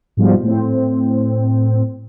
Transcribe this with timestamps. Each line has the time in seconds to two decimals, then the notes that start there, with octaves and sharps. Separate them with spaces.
0.17 G#2 B2 F3 G3
0.43 A2 C4